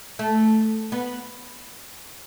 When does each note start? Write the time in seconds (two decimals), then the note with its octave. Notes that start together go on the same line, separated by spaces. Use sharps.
0.19 A3
0.92 B3